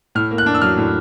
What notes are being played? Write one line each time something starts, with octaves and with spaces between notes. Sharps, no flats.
A2 F6
A#3
F#6
D4
E6
F#3 F6
A2